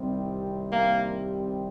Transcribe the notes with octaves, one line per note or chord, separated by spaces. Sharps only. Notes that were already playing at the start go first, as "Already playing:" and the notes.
Already playing: C2 C3 D#3 G3 C4
A#3